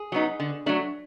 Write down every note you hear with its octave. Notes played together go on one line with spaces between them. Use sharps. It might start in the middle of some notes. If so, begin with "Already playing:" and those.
Already playing: G#4
F#3 B3 D#4
D3
F#3 A3 D4